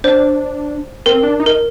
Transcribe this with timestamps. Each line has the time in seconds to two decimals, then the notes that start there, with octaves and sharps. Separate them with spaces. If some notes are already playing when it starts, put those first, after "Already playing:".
0.04 D4 C5
1.06 C4 A#4
1.23 D4
1.40 D#4
1.46 A#4